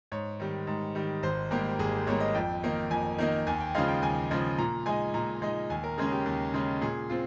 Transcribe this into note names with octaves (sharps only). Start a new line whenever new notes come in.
G#2 C#5
D#3 G3
G#2
D#3 G3
G#1 C5
G#2 G3 A#3 G4
G#1 G#4
G#2 G3 A#3 C#5
D#5
F2 G5
D#3 A#3 D#4
F2 G#5
D#3 A#3 D#4
D#2 G#5
G5
C#3 F3 G#3 D#4 F5
G5
D#2 G#5
C#3 F3 G#3 D#4
A#2 A#5
G#3 D#4 G#5
A#2 A#5
G#3 D#4
D#2 G#5
A#4
C#3 G#3 C#4 G#4
G4
D#2
C#3 G#3 C#4
A#2 G#4
C4 F4